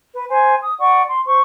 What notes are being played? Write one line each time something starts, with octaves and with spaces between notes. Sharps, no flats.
B4
C5 G#5
D#6
D5 F#5 C#6
C6
C5 C#6